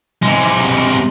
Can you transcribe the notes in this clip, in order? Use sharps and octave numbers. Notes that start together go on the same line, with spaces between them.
C3 G#3